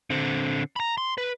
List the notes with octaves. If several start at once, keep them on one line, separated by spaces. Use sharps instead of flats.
D3 C4
A#5 B5
C6
B4